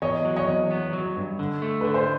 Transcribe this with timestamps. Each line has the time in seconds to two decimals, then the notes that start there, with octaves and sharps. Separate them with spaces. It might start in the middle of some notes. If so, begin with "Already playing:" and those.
0.02 E2 C#5 D#5
0.25 F#3
0.36 C#5 D#5
0.47 E2
0.71 B3
0.93 F#3
1.16 G2
1.39 D3
1.62 A3
1.81 D3 B4
1.94 C5